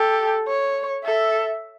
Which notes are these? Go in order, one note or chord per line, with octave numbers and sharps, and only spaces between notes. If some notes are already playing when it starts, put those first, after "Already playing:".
Already playing: G4 A4
C#5
A4 E5